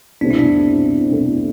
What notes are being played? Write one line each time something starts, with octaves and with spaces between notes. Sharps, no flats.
C2 B2 A3 C4 D4
E4
D4
C2 B2 A3 C4